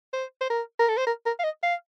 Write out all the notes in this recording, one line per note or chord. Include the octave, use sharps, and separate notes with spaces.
C5
C5
A#4
A#4
A4
C5
A#4
A#4
F5
D#5
F5